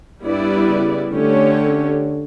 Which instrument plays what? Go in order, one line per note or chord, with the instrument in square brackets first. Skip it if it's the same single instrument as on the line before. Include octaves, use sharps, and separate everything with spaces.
[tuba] G2 [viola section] G3 B3 E4 B4 D5
[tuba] C#3
[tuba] D3 [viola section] A3 C#4 G4 C#5